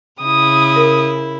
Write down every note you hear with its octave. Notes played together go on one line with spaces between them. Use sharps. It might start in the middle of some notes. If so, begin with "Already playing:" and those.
C#3 E4 D#6
A#4